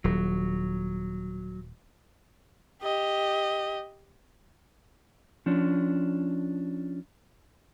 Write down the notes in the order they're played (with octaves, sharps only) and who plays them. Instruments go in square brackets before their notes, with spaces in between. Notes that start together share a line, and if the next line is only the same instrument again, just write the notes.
[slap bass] D#1 [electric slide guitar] F#3
[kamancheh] G4 D#5
[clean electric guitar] F3 C#4 D4